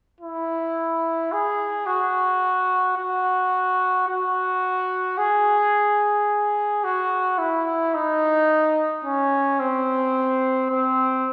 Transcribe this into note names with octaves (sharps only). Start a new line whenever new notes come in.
E4
G#4
F#4
F#4
F#4
G#4
F#4
E4
D#4
C#4
C4
C4